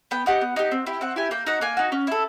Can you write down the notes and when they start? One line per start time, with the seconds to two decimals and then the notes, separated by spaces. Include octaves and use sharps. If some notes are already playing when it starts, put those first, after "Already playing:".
0.11 B3 G5
0.26 D#4 G4 F#5
0.41 B3
0.56 D#4 G4
0.71 C4
0.86 E4 G4
1.01 C4 F#5
1.16 E4 G4 G#5
1.31 A#3 G5
1.47 D#4 F#4 F#5
1.61 A#3 G#5
1.77 D#4 F#4
1.92 C#4
2.07 E4 A4